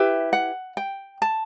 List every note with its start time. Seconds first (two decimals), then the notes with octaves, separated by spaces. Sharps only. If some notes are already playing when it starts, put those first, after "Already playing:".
Already playing: E4 G4 B4 E5
0.33 F#5
0.77 G5
1.22 A5